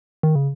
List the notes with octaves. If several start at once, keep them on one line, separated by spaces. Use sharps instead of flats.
D#3
C#3